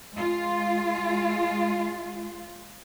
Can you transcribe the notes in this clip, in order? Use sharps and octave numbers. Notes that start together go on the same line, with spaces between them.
G#3 F4